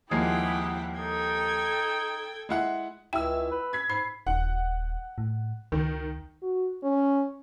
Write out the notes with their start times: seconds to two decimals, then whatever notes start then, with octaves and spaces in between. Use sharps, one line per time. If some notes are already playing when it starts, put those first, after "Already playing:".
0.11 D#2 F3 G#3 E4 G4 G#4 F#5
0.99 D#4 A4 G5 G#6
2.49 G#3 E4 F#5
3.13 C#2 E4 G5 E6
3.51 B4
3.73 G#6 B6
3.90 G#2 B5 C7
4.27 D#1 F#5
5.18 A2
5.72 C#2 D#3
6.42 F#4
6.83 C#4